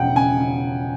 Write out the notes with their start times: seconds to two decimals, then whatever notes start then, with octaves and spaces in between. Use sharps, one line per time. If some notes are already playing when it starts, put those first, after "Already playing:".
Already playing: E1 C#3 F3 F#5 G5
0.16 C#3 G#5
0.40 C#3